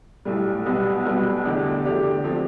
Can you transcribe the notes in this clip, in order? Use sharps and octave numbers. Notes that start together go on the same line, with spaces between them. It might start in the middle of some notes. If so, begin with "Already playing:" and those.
B1 A2 G3
B1 B2 G3 B3
B1 B2 G3 B3
E2 D3 A3 D4 G4
E2 D3 A3 D4 G4
F3 A3 C4